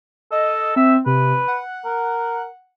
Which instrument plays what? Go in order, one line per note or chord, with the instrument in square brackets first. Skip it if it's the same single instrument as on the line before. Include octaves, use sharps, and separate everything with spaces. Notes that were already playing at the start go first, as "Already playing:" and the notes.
[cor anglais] A4 [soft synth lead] D#5
[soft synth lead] C4 [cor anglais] E5
[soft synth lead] C3 [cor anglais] B4
[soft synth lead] F#5
[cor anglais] A#4